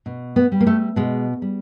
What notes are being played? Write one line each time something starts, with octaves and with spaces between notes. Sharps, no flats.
B2
B3
G3
A#3
A3
B2 G#3
G3